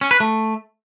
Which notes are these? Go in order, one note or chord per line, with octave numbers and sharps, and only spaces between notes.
C#4
B4
A3